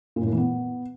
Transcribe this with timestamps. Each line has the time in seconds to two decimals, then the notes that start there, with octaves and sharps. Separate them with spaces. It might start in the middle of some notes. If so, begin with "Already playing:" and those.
0.16 A#2
0.21 A2
0.27 A#2
0.32 E3
0.37 B3